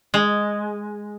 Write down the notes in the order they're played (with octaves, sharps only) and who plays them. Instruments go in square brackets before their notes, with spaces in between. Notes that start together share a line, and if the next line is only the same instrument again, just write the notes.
[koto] G#3